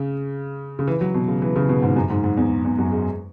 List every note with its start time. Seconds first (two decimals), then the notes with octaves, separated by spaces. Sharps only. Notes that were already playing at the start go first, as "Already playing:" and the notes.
Already playing: C#3
0.79 C#3
0.87 E3
1.01 F#3
1.15 B2
1.28 C#3
1.42 E3
1.56 C#3
1.69 B2
1.82 G#2
1.96 F#2
2.10 G#2
2.24 G#2
2.37 E2
2.64 E2
2.79 F#2
2.91 G#3